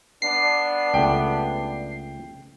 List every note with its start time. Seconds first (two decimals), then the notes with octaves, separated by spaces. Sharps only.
0.22 G2 B3 D4 C7
0.94 C#2 A3 G5